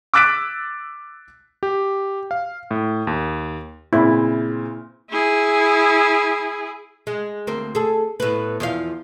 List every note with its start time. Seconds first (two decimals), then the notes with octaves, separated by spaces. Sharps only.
0.14 D6 E6 F#6 A6 B6 D7
1.63 G4
2.31 F5
2.71 A2
3.07 D#2
3.93 A#2 C#3 C4 E4
5.10 E4 G#4
7.07 G#3
7.47 D2 A#3 C4
7.75 G#4 A4
8.20 A2 B3 B4
8.60 E2 F3 F5